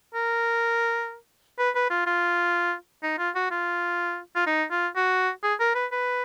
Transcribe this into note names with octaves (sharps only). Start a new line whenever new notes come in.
A#4
B4
B4
F4
F4
D#4
F4
F#4
F4
F4
D#4
F4
F#4
G#4
A#4
B4
B4